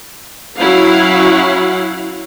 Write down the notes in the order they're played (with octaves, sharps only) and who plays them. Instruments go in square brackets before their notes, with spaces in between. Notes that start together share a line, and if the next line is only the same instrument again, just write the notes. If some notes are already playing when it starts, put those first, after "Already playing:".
[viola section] F#3 C#4 E4 F5 F#5